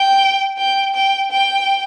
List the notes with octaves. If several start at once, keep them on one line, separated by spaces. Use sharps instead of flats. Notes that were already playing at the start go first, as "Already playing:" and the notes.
Already playing: G5
G5
G5
G5